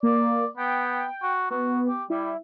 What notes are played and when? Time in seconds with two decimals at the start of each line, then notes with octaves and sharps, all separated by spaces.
0.03 A#3 D5
0.57 B3 G5
1.23 F#4
1.50 B3 F#4
1.88 G4
2.10 G3 E4